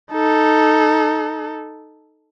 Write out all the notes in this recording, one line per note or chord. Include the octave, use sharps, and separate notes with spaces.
D#4 A4